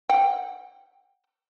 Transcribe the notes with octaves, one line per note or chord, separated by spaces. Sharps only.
F#5 G5